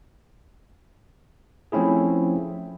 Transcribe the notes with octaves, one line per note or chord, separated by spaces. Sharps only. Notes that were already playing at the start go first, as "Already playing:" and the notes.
F3 A3 C4 C#4 E4 G#4